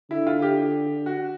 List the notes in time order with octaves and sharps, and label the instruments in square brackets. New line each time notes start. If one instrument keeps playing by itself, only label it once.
[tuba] D3 [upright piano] E4
[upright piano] F4
G4
F#4